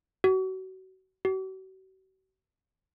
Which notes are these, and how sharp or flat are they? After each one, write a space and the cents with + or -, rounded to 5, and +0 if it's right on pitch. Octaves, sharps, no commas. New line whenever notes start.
F#4 +30
F#4 +45